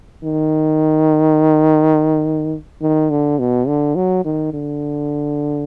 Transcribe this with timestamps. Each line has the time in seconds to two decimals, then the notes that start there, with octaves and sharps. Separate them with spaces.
0.23 D#3
2.81 D#3
3.10 D3
3.39 B2
3.67 D3
3.95 F#3
4.25 D#3
4.53 D3